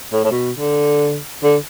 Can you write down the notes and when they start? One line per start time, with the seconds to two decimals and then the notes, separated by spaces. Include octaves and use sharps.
0.12 A2
0.24 A2
0.31 B2
0.59 D3
1.43 D3